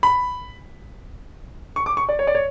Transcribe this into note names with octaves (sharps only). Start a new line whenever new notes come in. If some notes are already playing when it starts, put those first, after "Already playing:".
B5
C#6
D6
C#6
D5
C#5
D5
C#5